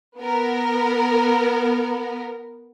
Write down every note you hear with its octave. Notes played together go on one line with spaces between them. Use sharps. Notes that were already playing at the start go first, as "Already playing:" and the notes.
B3 A#4